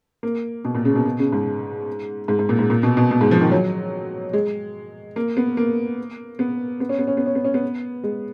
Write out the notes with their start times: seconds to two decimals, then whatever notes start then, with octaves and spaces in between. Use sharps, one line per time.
0.23 A#3
0.65 B2
0.75 A#2
0.85 C#3
0.95 B2
1.06 B2
1.19 C#3
1.33 G#2
2.28 G#2
2.39 G#2
2.49 A#2
2.59 G#2
2.70 A#2
2.83 B2
2.97 B2
3.11 B2
3.21 G#2
3.31 F3
3.41 D#3
3.51 F#3
4.33 G#3
5.16 A#3
5.37 B3
5.57 A#3
6.39 B3
6.80 B3
6.89 C#4
6.98 B3
7.07 C#4
7.17 B3
7.26 C#4
7.35 B3
7.45 C#4
7.54 B3
8.03 G#3